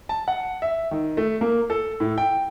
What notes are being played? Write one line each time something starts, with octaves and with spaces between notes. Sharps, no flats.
A5
F#5
E5
D#3
A3
A#3
A4
A2
G5